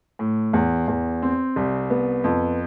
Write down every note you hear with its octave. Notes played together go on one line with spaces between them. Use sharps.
A2
E2
E2
C4
C2
B3
F2